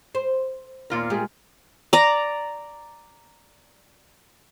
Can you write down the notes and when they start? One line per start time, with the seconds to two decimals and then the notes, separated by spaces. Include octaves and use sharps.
0.15 C5
0.90 D#2 A#2 F4 A#4
1.10 G#3 G4 G#4
1.93 D5 A#5